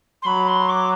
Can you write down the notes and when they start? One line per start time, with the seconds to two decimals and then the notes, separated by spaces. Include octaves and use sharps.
0.22 C6
0.26 F#3 B5
0.47 C6
0.69 D6